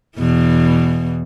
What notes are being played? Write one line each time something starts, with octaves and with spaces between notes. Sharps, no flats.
E2 B2 E3